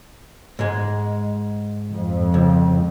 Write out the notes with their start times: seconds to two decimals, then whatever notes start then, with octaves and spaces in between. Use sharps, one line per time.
0.59 G#2 G#3
1.92 F2
2.34 C#2